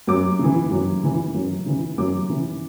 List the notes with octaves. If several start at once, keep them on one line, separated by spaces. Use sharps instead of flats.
F#2 D6
C#3 E3
F#2
C#3 E3
F#2
C#3 E3
F#2 D6
C#3 E3